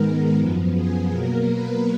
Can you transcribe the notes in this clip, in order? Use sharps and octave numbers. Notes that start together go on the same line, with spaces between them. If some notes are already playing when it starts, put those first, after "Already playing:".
Already playing: G#2 D#3 G#3 B3 A#4
F#2 F3 B3
G#4
B2 F#3 A#3 A#4
B4